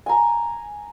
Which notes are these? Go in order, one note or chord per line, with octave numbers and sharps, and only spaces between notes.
G#5 A#5